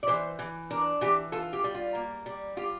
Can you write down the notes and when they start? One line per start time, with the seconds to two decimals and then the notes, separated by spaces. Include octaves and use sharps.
0.03 D5
0.08 E3 C5
0.39 E3
0.70 D4 A#4
1.01 E3 G4
1.32 F4 A4
1.53 G4
1.64 G3
1.75 F4
1.95 A#3
2.26 G3
2.57 F4 G4